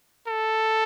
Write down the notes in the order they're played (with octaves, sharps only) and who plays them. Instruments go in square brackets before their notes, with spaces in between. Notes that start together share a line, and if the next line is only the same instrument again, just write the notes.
[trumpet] A4